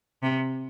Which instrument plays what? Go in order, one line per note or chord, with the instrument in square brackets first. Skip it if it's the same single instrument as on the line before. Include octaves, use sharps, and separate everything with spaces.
[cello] C3